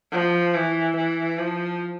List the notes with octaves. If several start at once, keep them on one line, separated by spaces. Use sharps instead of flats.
F3
E3
E3
F3